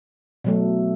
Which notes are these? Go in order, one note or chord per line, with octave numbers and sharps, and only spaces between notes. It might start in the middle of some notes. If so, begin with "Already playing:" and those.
B2 F#3 A3